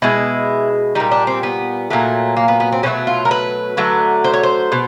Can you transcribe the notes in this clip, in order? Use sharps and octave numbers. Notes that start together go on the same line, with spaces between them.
B2 G#3 E4
A#2 G3 D#4
D4
C4
B3
A#2 F#3 A3
A#3
B3
B3
C4
B2 F#3 A3 C#4
F4
A#4
B4
D3 F#3 A3
C5
C#5
C5
B2